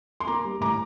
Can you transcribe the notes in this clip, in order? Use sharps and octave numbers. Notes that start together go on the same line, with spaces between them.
C6
A#3 A#5 D6
G3
A2 A#5 D6